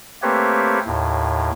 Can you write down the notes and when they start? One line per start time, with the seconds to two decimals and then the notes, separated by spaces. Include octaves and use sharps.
0.22 A3 A#3 C4 G4 B4 C#5
0.86 D#2 A2